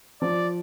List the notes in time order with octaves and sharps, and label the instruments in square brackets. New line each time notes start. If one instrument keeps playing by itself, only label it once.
[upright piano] F3 [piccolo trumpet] D5